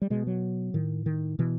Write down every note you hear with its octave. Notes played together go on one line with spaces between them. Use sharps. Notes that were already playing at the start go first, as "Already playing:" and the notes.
G3
B2 G#3
F#3
A2 D#3
D#3
B2 E3